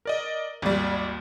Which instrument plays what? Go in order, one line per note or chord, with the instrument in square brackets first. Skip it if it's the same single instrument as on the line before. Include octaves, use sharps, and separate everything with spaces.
[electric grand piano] A#4 D5 D#5
[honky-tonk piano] G#1 G3 [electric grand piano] D#2